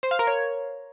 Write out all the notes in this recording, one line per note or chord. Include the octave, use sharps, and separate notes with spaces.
C5
F5
A#4
C#5